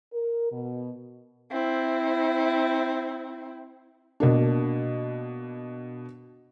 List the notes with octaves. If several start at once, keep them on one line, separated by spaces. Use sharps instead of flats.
A#4
B2
C4 E4
B2 A#3 D4